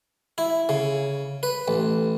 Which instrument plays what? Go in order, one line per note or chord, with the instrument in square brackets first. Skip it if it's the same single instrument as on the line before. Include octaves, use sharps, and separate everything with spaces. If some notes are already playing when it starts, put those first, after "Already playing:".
[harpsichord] E4
C#3
B4
A1